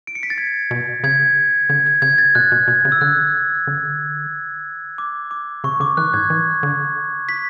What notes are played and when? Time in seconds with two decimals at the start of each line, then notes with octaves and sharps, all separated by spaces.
0.07 D7
0.15 C#7
0.23 B6
0.30 A6
0.38 G#6
0.71 B2
1.03 C#3 G#6
1.69 D3 G#6
1.86 G#6
2.02 C#3 G#6
2.18 A6
2.35 B2 F#6
2.52 B2
2.68 B2 G#6
2.85 C#3
2.92 E6
3.01 D3 F#6
3.67 D3
4.98 D6
5.31 D6
5.64 C#3 C#6
5.80 D3 D6
5.97 E3 F#6
6.13 A2 G#6
6.30 E3
6.63 D3
7.29 B6